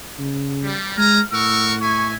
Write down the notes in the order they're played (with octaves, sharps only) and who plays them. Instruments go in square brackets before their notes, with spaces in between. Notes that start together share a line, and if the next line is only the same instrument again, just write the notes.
[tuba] C#3
[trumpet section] G3
[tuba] G#3 [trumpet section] G#5 A#5 [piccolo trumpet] F6
[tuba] A2 [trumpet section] A#4 F#5 C#6 [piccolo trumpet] E6
[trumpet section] E5 G#5 [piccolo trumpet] C#6